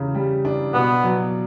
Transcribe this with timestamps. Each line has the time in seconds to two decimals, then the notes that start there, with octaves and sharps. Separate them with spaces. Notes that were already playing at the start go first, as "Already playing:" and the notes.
Already playing: E2 C#3
0.15 G3
0.45 D4
0.74 B2 B3
1.04 F#3